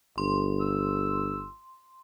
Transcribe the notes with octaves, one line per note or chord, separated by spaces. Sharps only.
G1 C6
E6